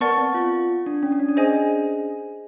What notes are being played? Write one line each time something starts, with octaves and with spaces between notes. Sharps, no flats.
B3 A#4 D5 F#5 A5 C#6
C4
F4
D4
C#4
D4
C#4
D4
G#4 C5 D#5 G#5